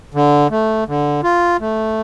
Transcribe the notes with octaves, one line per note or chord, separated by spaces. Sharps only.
D3
A3
D3
F4
A3